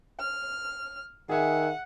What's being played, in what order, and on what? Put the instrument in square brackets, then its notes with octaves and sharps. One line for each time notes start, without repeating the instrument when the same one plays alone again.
[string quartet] F6
[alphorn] D#3 [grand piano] G#4 E5 G#5 [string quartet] F#5